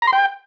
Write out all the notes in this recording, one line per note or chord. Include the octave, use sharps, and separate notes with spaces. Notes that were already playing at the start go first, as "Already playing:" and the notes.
A#5
C6
G5